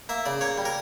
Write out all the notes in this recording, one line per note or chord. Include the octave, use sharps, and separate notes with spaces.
A#3 E5
C#3 D5
A#3 C#5
G3
A#4